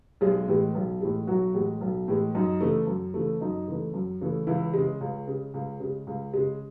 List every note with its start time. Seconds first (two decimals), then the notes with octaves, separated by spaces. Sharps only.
0.21 B1 G#3 G#4
0.48 A2 E3 G#3
0.75 B1
1.01 A2 E3 G#3
1.27 B1 F#3 F#4
1.54 A2 E3 G#3
1.81 B1
2.08 A2 E3 G#3
2.35 F#2 D#4
2.61 C#3 E3 A3
2.87 F#2
3.14 C#3 E3 A3
3.41 F#2 D#4
3.68 C#3 E3 A3
3.94 F#2
4.21 C#3 E3 A3
4.47 C#2 E3 E4
4.74 C#3 G#3
5.01 C#2
5.27 C#3 G#3
5.54 C#2
5.80 C#3 G#3
6.07 C#2
6.34 C#3 G#3